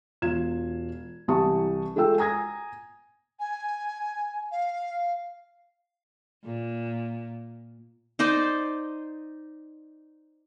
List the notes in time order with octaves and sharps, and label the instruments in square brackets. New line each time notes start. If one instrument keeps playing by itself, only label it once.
[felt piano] E1 F4 G#6 E7
C2 E3 G4 A5 C#6 D#6
G#3 A3 F4 G5 E6
G#5 A#5 D#6 G#6 A#6
[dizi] G#5
F5
[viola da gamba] A#2
[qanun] D#4 C5 D5 D#5